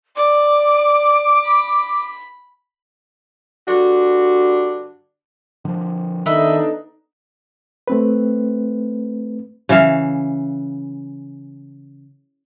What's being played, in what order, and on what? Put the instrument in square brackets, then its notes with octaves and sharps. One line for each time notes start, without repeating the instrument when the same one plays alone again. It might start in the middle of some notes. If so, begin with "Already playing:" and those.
[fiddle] D5 [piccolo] D6
[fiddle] B5
[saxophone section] G2 D3 D4 F#4
[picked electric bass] D3 F3
[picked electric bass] D#3 [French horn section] B3 D4 A4 [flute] D#4 [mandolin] B4 D#5 E5
[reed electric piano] A3 C4 B4
[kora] C#3 E3 E5 F5